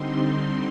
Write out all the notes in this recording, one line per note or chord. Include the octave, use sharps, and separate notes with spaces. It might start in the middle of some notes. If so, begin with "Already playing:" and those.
Already playing: D3 G3 C4 D#4 C6